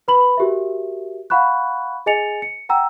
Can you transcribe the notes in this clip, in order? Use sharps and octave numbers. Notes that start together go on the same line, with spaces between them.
B4 B5 F#7
F#4 G4 A#4 E5
F5 F#5 B5 C#6 F#6
G#4 D#5 G#5 A6 C#7 F7
C#7
F#5 G5 A#5 E6